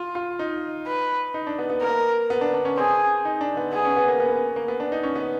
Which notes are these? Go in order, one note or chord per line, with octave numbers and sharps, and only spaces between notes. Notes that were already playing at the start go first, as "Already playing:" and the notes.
Already playing: F4
F4
D#4
B4
D#4
D4
B3
B3
A#3 A#4
B3
D4
D4
C#4
C4 G#4
D#4
D4
B3
B3 G#4
C#4
B3
A#3
B3
B3
A#3
B3
D4
D#4
C#4
B3